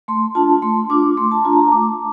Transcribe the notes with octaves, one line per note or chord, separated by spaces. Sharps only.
A3 C6
D4 F4 A5
A3 C6
D4 F4 D6
A3 C6
A5
D4 F4 A#5
A5
A#5
A3 D6